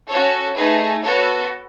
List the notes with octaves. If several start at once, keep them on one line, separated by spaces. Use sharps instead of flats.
C#4 F#4 A4 C#5
A3 D#4 G#4 B4
B3 F#4 A4 C#5